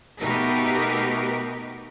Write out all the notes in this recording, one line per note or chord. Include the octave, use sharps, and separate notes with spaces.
B2 A3 D#4 G4 A#4 B4